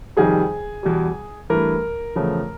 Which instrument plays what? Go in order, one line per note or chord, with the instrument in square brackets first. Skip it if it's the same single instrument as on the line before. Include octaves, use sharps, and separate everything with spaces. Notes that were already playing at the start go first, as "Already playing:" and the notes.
[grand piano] F2 C3 D#3 G3 G#4
E2 B2 G3
G2 E3 A3 A#4
E2 C#3 F3 A3